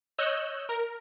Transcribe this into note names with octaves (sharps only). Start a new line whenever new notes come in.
C#5 D#5 E6 F#6 G6
A#4